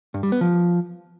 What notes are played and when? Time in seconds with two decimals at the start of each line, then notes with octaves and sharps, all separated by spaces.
0.14 G2
0.23 G3
0.32 B3
0.41 F3